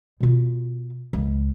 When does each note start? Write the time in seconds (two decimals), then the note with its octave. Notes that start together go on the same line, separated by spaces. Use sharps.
0.20 B2 F4
1.13 C#2